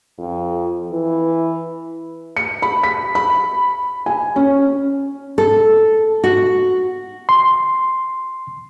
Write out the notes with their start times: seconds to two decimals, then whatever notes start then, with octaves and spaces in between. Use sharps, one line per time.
0.18 F2
0.92 E3
2.37 C#7
2.62 B5
2.83 B6
3.15 B5
4.06 G#5
4.36 C#4
5.38 A4
6.24 F#4
7.29 C6